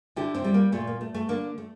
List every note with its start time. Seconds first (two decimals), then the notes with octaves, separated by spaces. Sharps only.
0.16 D3 E4 G4
0.35 C4 E4
0.44 G3
0.54 A#3
0.72 A#2 A3
0.87 A#3
1.01 A3
1.14 A3
1.29 D3 A#3
1.58 A3